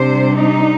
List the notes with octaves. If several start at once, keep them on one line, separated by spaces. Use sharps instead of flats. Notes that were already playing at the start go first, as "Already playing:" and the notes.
Already playing: C3 G3 D4 C5
D#4